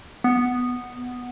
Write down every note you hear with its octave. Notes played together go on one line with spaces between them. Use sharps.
B3